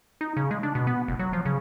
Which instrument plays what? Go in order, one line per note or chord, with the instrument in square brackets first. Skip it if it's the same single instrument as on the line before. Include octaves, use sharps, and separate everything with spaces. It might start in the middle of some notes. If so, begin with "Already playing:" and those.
[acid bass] D#4
C#3
G#3
D4
B2
B3
F1
F#3
F3
C#3